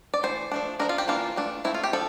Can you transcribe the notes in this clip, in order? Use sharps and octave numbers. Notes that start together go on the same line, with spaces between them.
D5
E3 A3 C5
F3 A3 D4
F3 A#3 D4 A#4
F4
G4
E3 A#3 D4 F4
E3 A3 D4
F3 A3 C4 E4
F4
G4
F3 A4